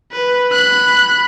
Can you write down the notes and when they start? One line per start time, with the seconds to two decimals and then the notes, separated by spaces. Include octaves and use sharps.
0.12 B4
0.52 B5 F#6